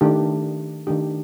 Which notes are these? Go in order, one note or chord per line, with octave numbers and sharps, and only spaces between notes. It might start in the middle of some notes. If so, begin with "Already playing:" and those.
D#3 A3 D4 G4
D#3 A3 D4 G4